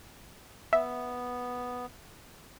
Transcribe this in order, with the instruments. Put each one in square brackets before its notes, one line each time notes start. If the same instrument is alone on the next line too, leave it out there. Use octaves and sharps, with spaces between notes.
[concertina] B3 [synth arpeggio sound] E5